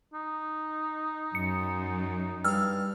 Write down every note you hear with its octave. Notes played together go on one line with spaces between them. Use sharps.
D#4
F#2 C#7
G2 F5 E6 F6